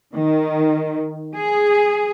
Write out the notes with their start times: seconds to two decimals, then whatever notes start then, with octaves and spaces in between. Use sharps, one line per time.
0.13 D#3
1.35 G#4